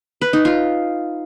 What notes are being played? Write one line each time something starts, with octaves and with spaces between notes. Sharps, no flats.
B4
D#4
F4